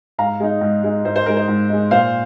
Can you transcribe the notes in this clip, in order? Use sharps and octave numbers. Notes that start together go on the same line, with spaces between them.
G#2 F5 A#5
G#3 D#4
G#2
G#3 D#4
G#2 C5
C5
G#3 D#4 A#4
C5
G#2
G#3 D#4
A#2 C5 F5